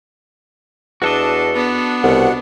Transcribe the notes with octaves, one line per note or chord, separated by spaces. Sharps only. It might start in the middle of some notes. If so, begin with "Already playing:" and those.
E2 D4 F#4 A4 D#5
B3 D4
C2 B2 F#5